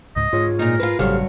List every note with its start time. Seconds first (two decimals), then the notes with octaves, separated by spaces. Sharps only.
0.16 C#2 G#2 D#5
0.33 G#2 F4 G#4 C#5
0.59 A#2 D#4 A#4
0.80 F4 G#4 B4
0.99 A1 G2 C#3 F#3 G4 A4 C5 F5